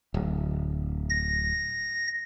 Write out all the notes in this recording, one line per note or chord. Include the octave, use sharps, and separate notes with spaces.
D1
A#6